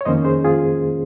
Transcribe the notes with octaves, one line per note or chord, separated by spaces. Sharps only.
C#5
F2 D#3 A#3 C#4 C5 D#5
G#4 C5
F4 G#4